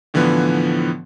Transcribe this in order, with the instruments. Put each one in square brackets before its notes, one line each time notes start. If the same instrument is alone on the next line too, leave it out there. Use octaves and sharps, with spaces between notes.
[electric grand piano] A2 D3 E3 F3 B3